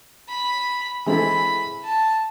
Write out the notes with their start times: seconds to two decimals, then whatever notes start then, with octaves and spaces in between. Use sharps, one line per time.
0.29 B5
1.06 E3 G#3 C4 E4 A4 B5
1.85 A5